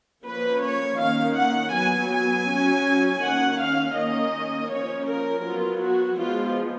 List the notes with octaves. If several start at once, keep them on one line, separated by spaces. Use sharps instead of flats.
F3 A#3 C#4 B4
C#5
D#3 A#3 C#4 F5
F#5
F#3 B3 G#5
G#5
F#3 C#4
D#3 A#3 C#4 F#5
F5
D#3 A#3 C#4 D#5
F3 A#3 C#4 C#5
A#4
F#3 B3 F4
F#4
F3 G#3 B3 F4